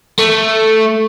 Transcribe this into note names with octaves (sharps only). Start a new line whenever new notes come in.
A3